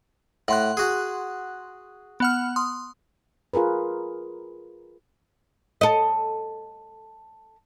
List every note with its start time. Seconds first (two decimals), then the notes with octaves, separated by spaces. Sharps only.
0.48 A2 F#5 C6 F#6
0.77 F#4 G#4
2.20 B3 F#5 F6
2.56 C6 D#6
3.54 F4 G#4 A#4 B4
5.81 A4 D#5